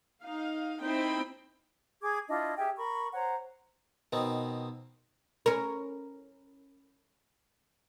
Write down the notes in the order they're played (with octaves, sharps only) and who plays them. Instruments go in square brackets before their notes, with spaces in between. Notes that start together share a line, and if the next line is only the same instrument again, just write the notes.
[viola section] D#4 F5
C4 D#4 E4 C5 G5 B5
[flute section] G#4 D6 G#6
D4 E4 F4 D#5
G4 G#4 E5 G5
A#4 B5 C#6
C5 C#5 F#5 A#5
[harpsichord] B2 D#3 B3 C4
[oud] C#4 A#4